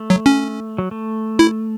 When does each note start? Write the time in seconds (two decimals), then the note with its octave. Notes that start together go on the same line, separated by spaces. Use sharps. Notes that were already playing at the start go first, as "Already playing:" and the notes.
Already playing: A3
0.10 F#3
0.26 C#4
0.78 F#3
0.91 A3
1.39 E4